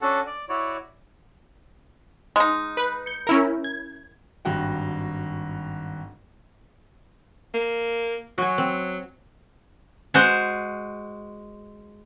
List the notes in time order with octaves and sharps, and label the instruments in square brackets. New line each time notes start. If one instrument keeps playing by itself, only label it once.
[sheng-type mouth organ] C#4 D4 F#4 A4 F#5 A5
D5
E4 F#4 C#5 D5
[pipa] G#3 D#4
[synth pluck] B4
G6 C#7
C#4 E4 A#4
G#6
[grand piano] G#1 G2 F#4 G5
[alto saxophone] A#3
[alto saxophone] F#3 [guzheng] F#4 G#5
[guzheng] C4
[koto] G#3 F#4 C5